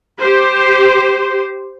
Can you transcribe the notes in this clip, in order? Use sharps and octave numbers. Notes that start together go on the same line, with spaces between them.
G4 C5